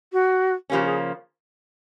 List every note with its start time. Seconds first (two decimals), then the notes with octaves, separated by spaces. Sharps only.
0.12 F#4
0.70 C#3 F3 A#3 C#4 G4
0.84 G#4